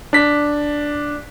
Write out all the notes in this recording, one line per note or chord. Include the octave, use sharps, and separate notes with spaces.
D4 B6